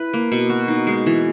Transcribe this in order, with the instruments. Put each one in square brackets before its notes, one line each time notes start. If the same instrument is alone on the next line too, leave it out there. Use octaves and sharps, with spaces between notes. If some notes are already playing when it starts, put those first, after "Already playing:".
Already playing: [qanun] E4 B4
A#3
B2
F#4
D#4
G#3
E3